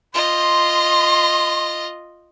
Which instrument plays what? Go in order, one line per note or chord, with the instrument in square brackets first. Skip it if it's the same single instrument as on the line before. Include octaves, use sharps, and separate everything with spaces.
[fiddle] F4 D#5 [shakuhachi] C6